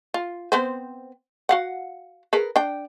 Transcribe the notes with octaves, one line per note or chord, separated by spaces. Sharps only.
F4
B3 C4 C5
F#4 F5 F#5
G#4 A#4 B4
D4 G5